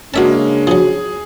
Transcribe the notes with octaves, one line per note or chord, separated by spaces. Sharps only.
C#3 G#3 A#3 C#4 D4 F#4 E5 A5
F3 F#3 G#4